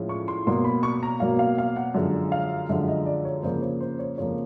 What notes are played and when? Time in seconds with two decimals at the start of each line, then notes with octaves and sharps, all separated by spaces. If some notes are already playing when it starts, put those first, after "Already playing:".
Already playing: A2 F3 G#3 C#4
0.09 C#6
0.28 C6
0.46 B2 F#3 A#3 C6
0.64 B5
0.83 C#6
1.03 A#5
1.20 B2 F#3 A#3 F5
1.39 F5
1.58 F5
1.77 F#5
1.94 F#2 D3 F3 G#3
2.32 F5
2.69 F#2 D3 F3 G#3 E5
2.88 D#5
3.06 D5
3.25 C#5
3.43 F2 C#3 F3 A#3 C5
3.62 C#5
3.80 C5
3.99 C#5
4.18 F2 C#3 F3 A#3 C#5